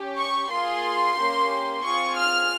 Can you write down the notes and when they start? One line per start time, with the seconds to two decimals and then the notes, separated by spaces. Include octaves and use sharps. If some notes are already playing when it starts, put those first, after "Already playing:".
Already playing: C#4 G4
0.17 C#6
0.50 A#3 F4 G#4 C6
1.16 A#3 C#4 G4
1.83 C4 F4 G#4 C#6
2.16 F6